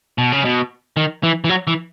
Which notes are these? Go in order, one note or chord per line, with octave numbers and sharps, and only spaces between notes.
B2
C#3
B2
D#3
E3
E3
F#3
E3